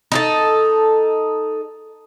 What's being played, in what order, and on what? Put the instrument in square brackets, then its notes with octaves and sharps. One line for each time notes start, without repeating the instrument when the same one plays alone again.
[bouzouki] D#4 E4 A4